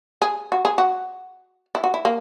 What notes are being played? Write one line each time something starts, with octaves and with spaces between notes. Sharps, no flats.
G#4
F#4
G#4
F#4
E4
F#4
E4
A#3